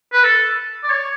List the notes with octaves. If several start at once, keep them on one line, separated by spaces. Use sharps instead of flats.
B4
A4
D5
C#5